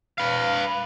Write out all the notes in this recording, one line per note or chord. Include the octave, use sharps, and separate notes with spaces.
B4 F5